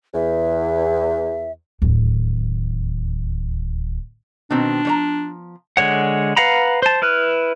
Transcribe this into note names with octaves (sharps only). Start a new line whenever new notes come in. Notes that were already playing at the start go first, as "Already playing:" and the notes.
E2 E5
D1 D#2
B2 D#3 C4 D4
F3 C#5 A#5
D3 G#3 C#5 F#5
B4 F5 F#5 A#5 B5
C5 A5
E4 B4 F6 F#6